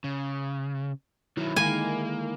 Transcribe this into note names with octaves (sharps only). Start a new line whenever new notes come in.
C#3
D#3 F#3 E4
D3 D#3 G#3 A#3 G#5